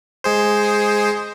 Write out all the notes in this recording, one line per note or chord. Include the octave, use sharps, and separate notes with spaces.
G#3 G#4 C5